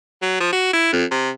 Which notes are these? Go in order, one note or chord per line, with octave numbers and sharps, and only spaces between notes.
F#3
F3
F#4
E4
F2
C3